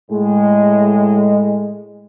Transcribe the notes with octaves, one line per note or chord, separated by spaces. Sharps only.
A2 G#3